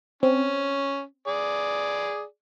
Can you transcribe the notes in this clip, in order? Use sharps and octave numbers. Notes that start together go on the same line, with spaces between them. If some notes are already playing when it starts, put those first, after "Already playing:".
C4 C#4
G#4 D5